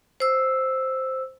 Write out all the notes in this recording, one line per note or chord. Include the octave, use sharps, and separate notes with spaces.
C5 E6